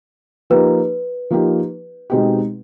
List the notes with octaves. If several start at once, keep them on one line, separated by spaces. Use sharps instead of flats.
F3 A#3 D#4 G4 B4
F3 A#3 D#4 G4
B2 G#3 C4 D#4 G4